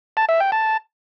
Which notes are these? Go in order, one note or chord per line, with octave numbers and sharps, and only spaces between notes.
A5
E5
G5
A5